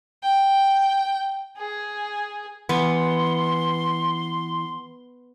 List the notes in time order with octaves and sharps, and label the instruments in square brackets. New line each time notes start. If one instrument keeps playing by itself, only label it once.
[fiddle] G5
G#4
[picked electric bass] E3 [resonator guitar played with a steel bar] B3 [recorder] C6